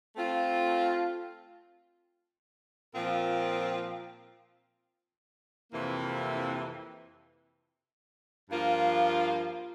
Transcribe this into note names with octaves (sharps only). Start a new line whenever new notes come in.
A3 C4 F4
A#2 F3 C4 F4 A#4
F2 C3 E3 A#3 E4
G2 F3 A#3 F4